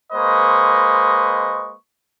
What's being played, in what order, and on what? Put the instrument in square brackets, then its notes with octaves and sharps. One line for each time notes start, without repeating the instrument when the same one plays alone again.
[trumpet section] G#3 A#3 B4 C5 D#5 C#6